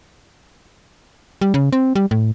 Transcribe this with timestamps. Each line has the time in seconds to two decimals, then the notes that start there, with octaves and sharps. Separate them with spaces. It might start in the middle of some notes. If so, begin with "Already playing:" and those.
1.41 G3
1.54 C#3
1.73 C4
1.95 G3
2.11 A2